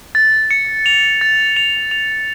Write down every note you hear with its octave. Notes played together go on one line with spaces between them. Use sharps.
A6
C#7
F7
A6
F7
F7